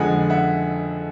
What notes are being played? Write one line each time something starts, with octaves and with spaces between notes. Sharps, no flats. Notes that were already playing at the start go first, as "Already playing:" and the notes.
Already playing: F2 D3 F3 G#3 F#5 G#5
E5 F#5